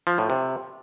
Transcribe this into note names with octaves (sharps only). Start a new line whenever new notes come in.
F3
A2
C3